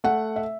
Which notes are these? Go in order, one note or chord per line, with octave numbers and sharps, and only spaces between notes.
A3 F#5
E5